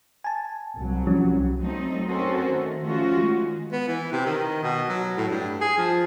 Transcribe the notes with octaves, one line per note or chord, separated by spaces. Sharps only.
G#5 A5
C2 F#3
F3 G3 C#4
F#3 A3 C4 D#4
C4 C#4 F#4 A4 A#4 C5
D#3 A3
F3 A3 C#4 F4 F#4
D#3 G#3
B3
E3
C3
D#3
B2
F#3
A2
G2
G#4
F3